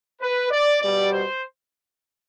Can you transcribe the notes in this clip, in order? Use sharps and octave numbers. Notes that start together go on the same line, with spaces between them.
B4
D5
B2 G3 D5
C5